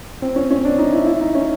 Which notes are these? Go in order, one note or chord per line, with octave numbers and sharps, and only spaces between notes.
C4
C#4
C#4
D4
D#4
E4
E4
D#4
C#4